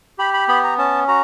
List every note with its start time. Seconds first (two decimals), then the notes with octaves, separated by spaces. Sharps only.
0.18 G4 B5
0.34 B5
0.48 B3 B5
0.64 A#5
0.78 C#4 A5
1.08 F#4 A#5